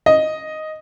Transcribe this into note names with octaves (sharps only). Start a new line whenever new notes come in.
D#5